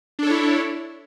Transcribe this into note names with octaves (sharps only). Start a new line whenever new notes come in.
D4 E4 A4 C#5